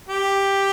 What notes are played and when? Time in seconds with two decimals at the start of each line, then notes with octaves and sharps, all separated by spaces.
0.08 G4